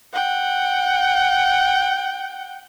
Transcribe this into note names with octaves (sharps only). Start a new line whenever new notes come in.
F#5 G5